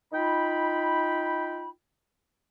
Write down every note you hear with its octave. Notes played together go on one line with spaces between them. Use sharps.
D#4 F4 G5 B5